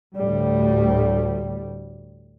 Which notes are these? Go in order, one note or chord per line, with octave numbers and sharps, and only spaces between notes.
D2 A2 G3